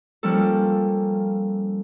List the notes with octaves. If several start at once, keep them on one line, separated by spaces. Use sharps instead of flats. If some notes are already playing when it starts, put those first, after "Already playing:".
F3 G3 A#3 C#4 A4